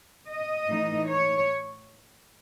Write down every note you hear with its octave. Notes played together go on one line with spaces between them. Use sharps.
D#5
A2 E3 A3 D#4
C#5